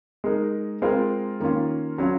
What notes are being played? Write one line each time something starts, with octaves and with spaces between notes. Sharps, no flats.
G#3 D#4 A#4
G#3 C4 F4 A#4
D#3 A#3 C#4 F4
F#3 C#4 F4